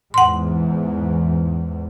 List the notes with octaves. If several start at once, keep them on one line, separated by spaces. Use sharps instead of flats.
E2 G#2 F#5 C6